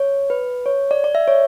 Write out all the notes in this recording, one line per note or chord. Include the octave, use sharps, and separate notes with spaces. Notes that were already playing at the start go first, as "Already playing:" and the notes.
Already playing: C#5
B4
C#5
D5
D5
E5
C#5